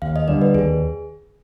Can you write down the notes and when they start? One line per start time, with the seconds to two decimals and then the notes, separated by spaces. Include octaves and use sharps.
0.02 D#2 F5
0.16 D#5
0.28 D3 G3 D5
0.42 B4
0.54 D#2 G#4